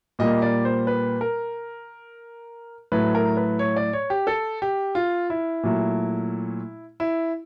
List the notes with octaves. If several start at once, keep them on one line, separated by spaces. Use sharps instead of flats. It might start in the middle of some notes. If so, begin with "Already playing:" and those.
A#2 G3 A#3 D#5
D5
C5
B4
A#4
A2 F#3 A3 B4
A#4
B4
C#5
D5
C#5
G4
A4
G4
F4
E4
A#2 F#3 A3
E4